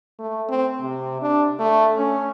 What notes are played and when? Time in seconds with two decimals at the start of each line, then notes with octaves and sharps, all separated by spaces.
0.19 A3
0.49 C4
0.81 C3
1.22 D4
1.60 A3
1.96 C#4